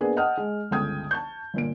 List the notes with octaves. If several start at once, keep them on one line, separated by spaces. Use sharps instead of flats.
A#3 B3 D4 G#4 B4
D#5 F#5 G5 A5 D#6 F6
G#3
G1 C#2 A4 G5 D#6 G#6
A5 C#6 G6
G1 A#2 D7